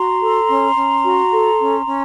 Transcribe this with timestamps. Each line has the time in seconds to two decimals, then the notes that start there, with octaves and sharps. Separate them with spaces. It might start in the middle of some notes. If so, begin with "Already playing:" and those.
Already playing: F#4 A#5 C6
0.22 A4
0.49 C#4
0.76 C#4
1.04 F#4
1.32 A4
1.59 C#4
1.86 C#4